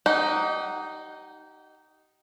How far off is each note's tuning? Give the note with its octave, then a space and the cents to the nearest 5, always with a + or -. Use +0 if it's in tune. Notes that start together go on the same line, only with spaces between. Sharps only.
D#4 +0 G4 -30 F#5 +0